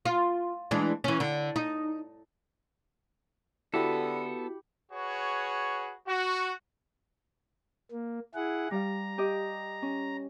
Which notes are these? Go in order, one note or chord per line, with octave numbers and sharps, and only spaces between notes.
F4
E3 G#3 D4
E3 C#4
D3
D#4
D3 B3 E4 F#4 G4 A4 B5
F#4 G#4 B4 C#5
F#4
A#3
E4 G#4 F#5
G3 F5 A#5
G4 D#5 D6
C#4